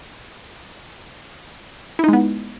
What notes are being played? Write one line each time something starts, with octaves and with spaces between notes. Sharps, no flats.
G#3 B3 D#4 E4